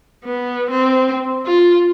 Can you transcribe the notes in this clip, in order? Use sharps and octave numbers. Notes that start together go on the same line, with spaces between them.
B3
C4
F4